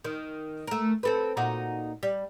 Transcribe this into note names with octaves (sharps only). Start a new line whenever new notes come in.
D#3
A3 A#4
C4 A4 B4
A#2 D#4 F#4
G3